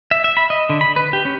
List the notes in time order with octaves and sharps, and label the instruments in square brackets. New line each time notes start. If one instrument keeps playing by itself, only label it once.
[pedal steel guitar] E5
E5
B5
D#5
D3
B5
B4
G4
C#4